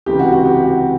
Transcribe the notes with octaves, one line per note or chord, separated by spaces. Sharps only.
C#2 C3 E3 G4
F#4
F#4
G4
F#4